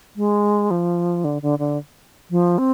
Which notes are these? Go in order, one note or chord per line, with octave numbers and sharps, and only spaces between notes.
G#3
F3
D3
D3
D3
F3
C4